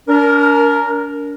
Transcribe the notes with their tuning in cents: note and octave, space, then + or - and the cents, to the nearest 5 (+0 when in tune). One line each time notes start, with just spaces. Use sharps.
D4 -40 A#4 +0